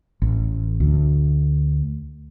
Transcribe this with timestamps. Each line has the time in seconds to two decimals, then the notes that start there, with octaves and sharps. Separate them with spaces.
0.22 A1
0.80 D2